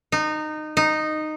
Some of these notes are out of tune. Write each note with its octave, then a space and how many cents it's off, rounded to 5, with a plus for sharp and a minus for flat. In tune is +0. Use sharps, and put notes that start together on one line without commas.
D#4 -20
D#4 -10